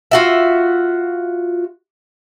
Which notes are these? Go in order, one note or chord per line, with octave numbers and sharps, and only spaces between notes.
F4 F#4 E5